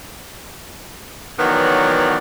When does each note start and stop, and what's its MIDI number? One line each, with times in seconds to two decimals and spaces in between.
1.40 2.16 51
1.40 2.16 52
1.40 2.16 54
1.40 2.16 59
1.40 2.16 73
1.40 2.16 74